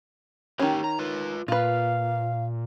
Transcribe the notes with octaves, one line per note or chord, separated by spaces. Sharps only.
D#3 C#4 G4 C#5
A#5
F4 B4
A#2 F4 B4 F5